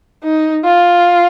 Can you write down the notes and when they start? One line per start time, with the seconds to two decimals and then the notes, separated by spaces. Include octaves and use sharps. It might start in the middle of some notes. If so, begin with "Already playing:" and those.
0.24 D#4
0.65 F4